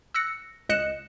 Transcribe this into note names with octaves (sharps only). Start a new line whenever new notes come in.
E6 F#6 A#6 C#7
C#2 D#5 F#6 C#7 E7